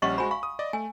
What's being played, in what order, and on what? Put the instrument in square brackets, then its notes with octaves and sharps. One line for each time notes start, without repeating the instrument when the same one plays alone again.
[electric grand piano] A#1 G3 C#4 [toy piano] D#5 F#5 C#6
[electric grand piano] G#3 F#4 C5 [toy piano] G#5 B5
[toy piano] F5 C#6 [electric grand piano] B5
[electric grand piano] D#6
D5 D#5
[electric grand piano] A3 [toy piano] G#5